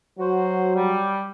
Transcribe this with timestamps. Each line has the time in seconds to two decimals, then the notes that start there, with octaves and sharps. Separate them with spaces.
0.19 F#3 F#4 C5
0.75 G3